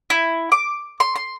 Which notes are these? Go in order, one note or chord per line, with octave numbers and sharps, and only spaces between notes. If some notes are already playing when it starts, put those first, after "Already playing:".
E4
D6
C6
C6